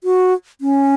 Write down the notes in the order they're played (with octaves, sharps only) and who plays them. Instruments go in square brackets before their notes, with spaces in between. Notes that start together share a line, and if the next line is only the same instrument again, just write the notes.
[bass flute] F#4
C#4